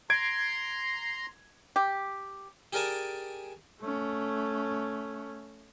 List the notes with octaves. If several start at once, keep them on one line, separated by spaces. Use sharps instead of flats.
A#5 C6 G#6 D7
G4
G4 G#4 A#4 D5 G#5 A5
A3 C#4